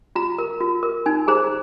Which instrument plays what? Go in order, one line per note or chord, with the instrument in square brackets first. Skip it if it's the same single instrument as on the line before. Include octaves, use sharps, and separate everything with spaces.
[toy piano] F4 A#5
A#4
F4
A#4
D#4 G#5
G#4 C5 A#5